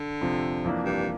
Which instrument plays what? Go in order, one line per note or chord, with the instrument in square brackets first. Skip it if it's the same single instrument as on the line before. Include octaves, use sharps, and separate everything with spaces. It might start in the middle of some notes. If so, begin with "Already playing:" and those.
Already playing: [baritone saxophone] D3
[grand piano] F2 C3 F3 C4
F2 E3 A#3 D4
[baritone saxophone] G2